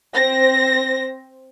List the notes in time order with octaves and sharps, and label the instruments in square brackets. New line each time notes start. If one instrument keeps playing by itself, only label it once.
[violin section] C4 C5 A#6